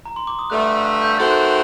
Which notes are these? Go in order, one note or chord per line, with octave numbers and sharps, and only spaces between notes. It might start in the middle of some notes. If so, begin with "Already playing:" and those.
A#5
C6
D6
D#6
G2 D3 A3 F#6
F#6
G6
D#3 A3 C4 F#4 A4 A6
F#6
F#6